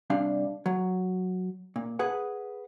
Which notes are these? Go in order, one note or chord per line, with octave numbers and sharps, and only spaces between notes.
C3 G3 D4 F5
F#3
A#2
G#4 B4 F#5